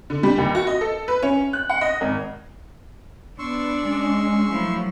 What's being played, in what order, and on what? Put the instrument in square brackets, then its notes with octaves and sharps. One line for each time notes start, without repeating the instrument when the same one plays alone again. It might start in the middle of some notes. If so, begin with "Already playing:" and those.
[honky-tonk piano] D3
G3
D#2
F#4
D#5
A4
B4
C#4
F#6
F#5
D#5
G#1
[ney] B3 [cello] D4 [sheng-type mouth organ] C6 C#6 E6
[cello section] G#3 [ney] C#4
[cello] F3 A3 [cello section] F#3 [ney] E4